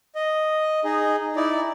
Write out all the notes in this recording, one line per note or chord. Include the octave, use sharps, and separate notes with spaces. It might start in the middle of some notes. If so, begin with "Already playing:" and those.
D#5
D#4 G#4
D#4 E4 D5